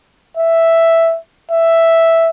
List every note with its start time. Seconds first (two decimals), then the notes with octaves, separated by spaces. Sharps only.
0.37 E5
1.51 E5